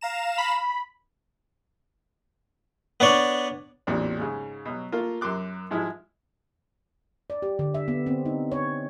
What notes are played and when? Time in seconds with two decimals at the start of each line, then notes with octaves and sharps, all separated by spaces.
0.01 F5 A#5 E7
0.38 B5
3.00 B3 D4 C#5 D5
3.87 A1 E2 A#2 C4 D4
4.18 G#2 C#3
4.65 B2 F#3
4.92 A3 A#3 F4
5.21 F#2 A#4 C6 D6 F#6
5.71 G#2 F3 G#3 E4
7.30 D5
7.42 G4
7.59 D3
7.74 E5
7.88 B3
8.06 C4
8.25 D#4
8.52 C#5